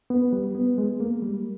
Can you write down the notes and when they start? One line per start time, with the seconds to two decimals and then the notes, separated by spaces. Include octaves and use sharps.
0.10 B3
0.33 G3
0.55 B3
0.78 G#3
1.00 A#3
1.22 G3